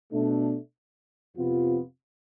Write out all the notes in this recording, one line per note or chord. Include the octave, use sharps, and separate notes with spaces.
B2 A3 D4
F2 C3 F3 B3 F4